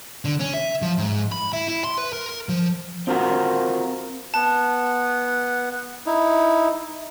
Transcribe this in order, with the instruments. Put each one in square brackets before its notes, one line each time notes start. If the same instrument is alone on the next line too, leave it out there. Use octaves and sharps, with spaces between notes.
[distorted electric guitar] D3
C#4
E5
F3
G#2
B5
E4
E4
C6
B4
A#4
F3
[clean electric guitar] C4 F4 F#4 A#4
[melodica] B3 F#5 [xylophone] A5
[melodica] D#4 E4